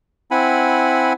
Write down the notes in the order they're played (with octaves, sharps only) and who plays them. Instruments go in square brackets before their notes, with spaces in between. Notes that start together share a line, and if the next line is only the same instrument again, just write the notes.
[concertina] C4 E4 F#5 G#5 B5